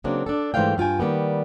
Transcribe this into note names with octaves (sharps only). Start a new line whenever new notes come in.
C#3 F#3 A#3 C4 D4
D4 A4
G#2 E3 A3 C5 F5 G5
G2 F4 G5 G#5
D#3 G3 A#3 B3